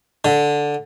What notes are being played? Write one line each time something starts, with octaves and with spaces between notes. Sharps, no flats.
D3